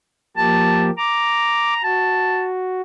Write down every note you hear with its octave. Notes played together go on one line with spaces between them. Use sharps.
F3 A#3 G4 A5
A#5 D6
F#4 A5